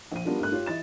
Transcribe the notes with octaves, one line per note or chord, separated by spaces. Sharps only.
A#1 D#7
G3 B3 D4 F4 A#4
G2 A3 A#4 F#6
F4 G4 C#5
E3 D#5 A6 E7